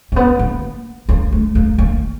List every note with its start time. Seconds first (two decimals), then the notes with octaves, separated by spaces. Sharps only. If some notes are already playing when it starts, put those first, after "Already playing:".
0.12 A#3
0.16 B3
0.39 A#3
1.09 A#3
1.32 A3
1.55 A#3
1.78 A#3